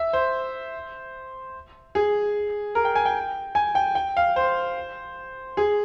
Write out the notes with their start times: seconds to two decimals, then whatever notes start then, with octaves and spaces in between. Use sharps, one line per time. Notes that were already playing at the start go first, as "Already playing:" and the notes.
Already playing: E5
0.13 C5
1.95 G#4
2.75 A#4
2.85 G5
2.95 G#5
3.05 G5
3.55 G#5
3.75 G5
3.95 G5
4.17 F5
4.36 C5
5.57 G#4